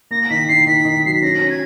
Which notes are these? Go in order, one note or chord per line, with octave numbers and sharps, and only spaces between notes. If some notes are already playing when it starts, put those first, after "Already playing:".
A#3 A#6
D#3 B6
D#3 C7
D#3 B6
D#3
F#3 C7
B6
C#4 A#6
C#4
G#6